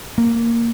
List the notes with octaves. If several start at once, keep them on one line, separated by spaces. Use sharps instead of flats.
A#3